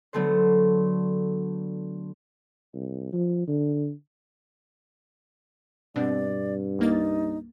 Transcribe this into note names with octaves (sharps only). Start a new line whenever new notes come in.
D3 F#3 A3 B3 C5
C2
F3
D3
G2 B2 C4 D4 D5
C2 A#3 D#4 A6